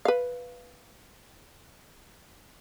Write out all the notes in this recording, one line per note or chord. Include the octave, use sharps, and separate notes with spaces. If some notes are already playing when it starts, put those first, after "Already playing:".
B4 F5